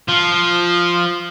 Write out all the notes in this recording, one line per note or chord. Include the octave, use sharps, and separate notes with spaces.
F3